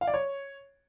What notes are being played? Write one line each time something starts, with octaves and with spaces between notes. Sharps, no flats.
F5
D5
C#5